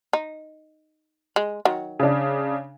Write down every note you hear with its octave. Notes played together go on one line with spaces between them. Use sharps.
D#4
G#3
D#3 F#3
C#3 D4